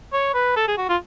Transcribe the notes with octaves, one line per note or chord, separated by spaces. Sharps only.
C#5
B4
A4
G#4
F#4
F4